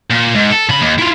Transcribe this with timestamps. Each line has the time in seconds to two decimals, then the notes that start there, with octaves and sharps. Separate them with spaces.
0.11 A#2
0.35 G#2
0.51 A4
0.69 C#3 B5
0.82 D#2
0.98 E4 F4